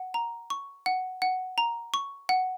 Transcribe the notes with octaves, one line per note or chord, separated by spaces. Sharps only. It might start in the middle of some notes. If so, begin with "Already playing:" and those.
Already playing: F#5
A#5
C#6
F#5
F#5
A#5
C#6
F#5